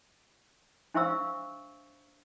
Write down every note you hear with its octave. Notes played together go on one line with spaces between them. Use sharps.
D4 C5 E5 F5 C#6 E6